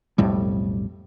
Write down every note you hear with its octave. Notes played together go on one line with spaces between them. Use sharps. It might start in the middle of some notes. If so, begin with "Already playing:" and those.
B1 F2 A2 G3